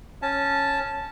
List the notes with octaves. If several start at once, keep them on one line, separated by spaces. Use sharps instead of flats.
C#4 A5